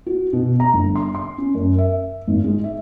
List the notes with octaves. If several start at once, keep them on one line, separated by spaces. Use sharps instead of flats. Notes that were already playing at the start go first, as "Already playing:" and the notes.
F#4
B2
A#5
G1
C6
C6
C#4
F#2
E5
G#1
G#3
E5